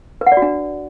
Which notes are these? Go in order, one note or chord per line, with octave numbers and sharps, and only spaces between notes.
B4
F#5
D5
F#4
D4